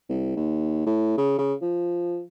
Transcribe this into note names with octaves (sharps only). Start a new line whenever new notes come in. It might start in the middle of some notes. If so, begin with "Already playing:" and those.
C2
D#2
A2
C#3
C#3
F3